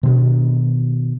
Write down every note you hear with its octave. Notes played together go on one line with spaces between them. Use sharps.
B2 D#3 D4